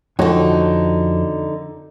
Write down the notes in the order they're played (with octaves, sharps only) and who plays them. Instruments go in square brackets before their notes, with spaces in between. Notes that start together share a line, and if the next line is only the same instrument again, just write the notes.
[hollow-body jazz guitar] F2 F#4 C#5 [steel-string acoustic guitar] D3 D#4